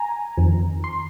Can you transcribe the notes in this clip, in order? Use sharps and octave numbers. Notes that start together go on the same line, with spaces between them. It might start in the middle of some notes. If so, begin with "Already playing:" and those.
Already playing: G#5 A#5
F2 D#3
C6